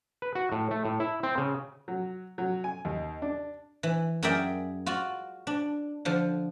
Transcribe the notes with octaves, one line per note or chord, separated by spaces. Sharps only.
B4
F#4
A2
A3
A2
E4
C4
C#3
F#3
F#3
G#5
D#2
D4
E3
F#2 G#4 A#4 D5 E5 G5
F4 F#4 D5
D4
D3 F3